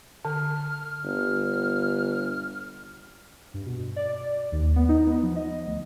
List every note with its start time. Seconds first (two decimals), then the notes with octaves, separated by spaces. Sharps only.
0.25 D3 F6
1.04 G1 F6
3.54 G2
3.66 B2
3.96 D5
4.52 D#2
4.76 B3
4.89 D#4
5.07 B3
5.23 F3
5.36 D#5
5.66 D2